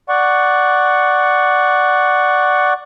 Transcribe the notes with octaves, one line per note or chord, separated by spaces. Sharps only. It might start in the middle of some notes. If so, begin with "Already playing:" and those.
D5 F#5 C#6